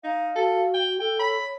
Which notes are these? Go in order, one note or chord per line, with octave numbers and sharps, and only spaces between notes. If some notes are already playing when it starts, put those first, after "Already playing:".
D#4 F5
F#4 A4
G5
A4 G5
C#5 B5